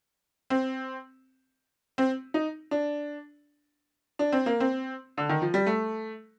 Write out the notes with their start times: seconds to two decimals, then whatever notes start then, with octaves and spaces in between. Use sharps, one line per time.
0.50 C4
1.98 C4
2.34 D#4
2.71 D4
4.19 D4
4.32 C4
4.46 A#3
4.60 C4
5.18 D3
5.29 D#3
5.42 F3
5.54 G3
5.66 A3